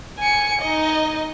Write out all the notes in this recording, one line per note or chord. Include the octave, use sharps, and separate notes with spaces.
G#5 C#7
D#4 D#5